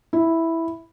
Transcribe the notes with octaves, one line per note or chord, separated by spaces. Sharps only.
E4